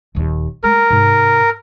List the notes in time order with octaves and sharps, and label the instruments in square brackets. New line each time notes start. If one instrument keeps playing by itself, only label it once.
[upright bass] D#1 D#2
[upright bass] G#3 A3 [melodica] A#4
[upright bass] G#2 C3